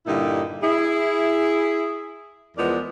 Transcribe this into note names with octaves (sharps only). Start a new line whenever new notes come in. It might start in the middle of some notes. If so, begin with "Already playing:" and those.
G2 A#2 D3 D#4 E4
E4 G#4
E2 F3 G#3 B3 A#4 D5